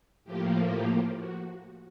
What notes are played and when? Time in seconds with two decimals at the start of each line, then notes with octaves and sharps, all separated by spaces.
0.24 A2 F3 A#3 G4
0.71 G4
1.17 F#4